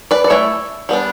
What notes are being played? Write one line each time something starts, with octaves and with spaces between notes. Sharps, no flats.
B4 D5
D5
A3 E4 C#5 E5
G3 B3 D4